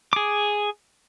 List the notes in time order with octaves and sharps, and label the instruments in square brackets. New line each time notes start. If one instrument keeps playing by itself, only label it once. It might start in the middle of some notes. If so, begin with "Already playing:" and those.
[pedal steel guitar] G#4 D6